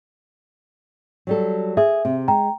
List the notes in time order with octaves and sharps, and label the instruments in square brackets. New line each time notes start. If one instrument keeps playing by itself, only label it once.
[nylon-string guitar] F#3 G3 A4
[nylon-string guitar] G#4 [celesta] E5
[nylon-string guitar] C3
[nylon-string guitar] G#3 [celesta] G5 A#5